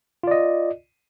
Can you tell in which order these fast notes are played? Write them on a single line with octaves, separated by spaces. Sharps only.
F4 D5 D#5